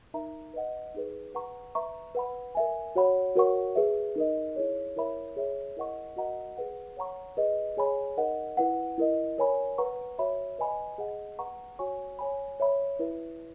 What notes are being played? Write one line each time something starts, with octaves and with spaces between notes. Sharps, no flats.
D#4 A#4 E5 A#5
B4 D#5 F#5
D#4 G#4 B4
B4 F#5 A#5 C#6
B4 E5 A#5 C#6
B4 F#5 B5
A#4 E5 G#5
F#4 C#5 F#5 B5
F#4 A#4 C#5 F#5 C#6
G#4 B4 E5
D#4 A#4 D#5
E4 G#4 C#5
E4 A#4 C#5 E5 B5
G#4 C#5 E5
E4 A#4 D#5 F#5 C#6
F#4 A#4 D#5 F#5 A#5
G#4 B4 F#5
C#5 F#5 A#5 C#6
G#4 B4 D#5
G#4 C#5 G#5 B5
D#4 A#4 D#5 F#5
E4 B4 F#5
E4 A#4 D#5
A#4 C#5 G#5 B5
B4 F#5 A#5 C#6
F#4 C#5 E5 B5
B4 D#5 G#5 B5
G#4 D#5 F#5
B4 F#5 A#5 C#6
F#4 C#5 G#5 C#6
C#5 G#5 B5
C#5 E5 B5
E4 B4 E5